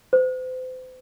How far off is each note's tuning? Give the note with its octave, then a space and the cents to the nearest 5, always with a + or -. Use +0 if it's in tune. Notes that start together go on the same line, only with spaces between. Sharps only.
C5 -40